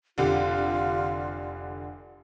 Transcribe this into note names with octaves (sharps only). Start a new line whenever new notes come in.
F1 D3 F4 G4